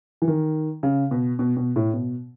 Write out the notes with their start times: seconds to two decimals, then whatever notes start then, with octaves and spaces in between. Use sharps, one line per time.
0.22 E3
0.28 D#3
0.83 C#3
1.11 B2
1.39 B2
1.57 B2
1.76 A2
1.94 B2